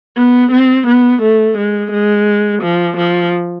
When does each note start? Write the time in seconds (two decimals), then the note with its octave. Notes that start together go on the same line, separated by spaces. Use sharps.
0.17 B3
0.51 C4
0.86 B3
1.22 A3
1.57 G#3
1.91 G#3
2.62 F3
2.97 F3